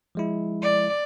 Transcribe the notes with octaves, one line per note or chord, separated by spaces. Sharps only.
F3 G#3 E4
D5